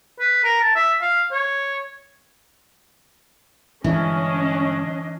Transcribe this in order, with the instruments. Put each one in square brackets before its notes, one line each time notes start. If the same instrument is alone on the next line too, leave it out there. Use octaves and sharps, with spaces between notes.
[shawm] B4
A#4
A5
E5
F5
C#5
[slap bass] G2 D3 G#3 [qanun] E3 [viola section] C#4 [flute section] D4 D#5